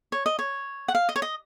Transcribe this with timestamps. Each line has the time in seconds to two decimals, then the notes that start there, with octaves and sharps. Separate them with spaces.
0.12 C#5
0.26 D#5
0.39 C#5
0.88 F#5
0.95 F5
1.09 D#5
1.16 C#5
1.22 D#5